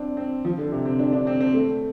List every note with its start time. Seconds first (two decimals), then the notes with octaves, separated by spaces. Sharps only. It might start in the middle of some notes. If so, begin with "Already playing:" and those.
Already playing: C4 D4
0.17 C4
0.45 F3
0.58 D3
0.72 C3
0.86 C4
0.99 D4
1.13 D4
1.27 C4
1.40 C4
1.54 A3